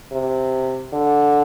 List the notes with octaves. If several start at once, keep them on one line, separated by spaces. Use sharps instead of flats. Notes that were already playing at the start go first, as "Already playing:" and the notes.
C3
D3